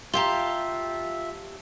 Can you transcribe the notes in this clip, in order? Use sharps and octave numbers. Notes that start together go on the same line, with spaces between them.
F4 G4 E5 F5 G5 A5 A#5 C6